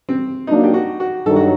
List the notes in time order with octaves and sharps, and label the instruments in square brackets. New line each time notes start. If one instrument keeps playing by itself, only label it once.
[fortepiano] C4
[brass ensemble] F#3 A#3 D4 [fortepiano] D#4
[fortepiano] G4
F#4
F#4
[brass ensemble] G2 D#3 F#3 [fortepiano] A4
[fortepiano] F#4